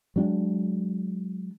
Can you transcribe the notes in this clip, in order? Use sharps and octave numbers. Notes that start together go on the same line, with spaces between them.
F#3 G#3 D4